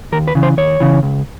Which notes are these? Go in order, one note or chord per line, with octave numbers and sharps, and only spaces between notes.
D#2 A#4
B4
C#3 E3
C5
D#2 C#5
C#3 E3
C#2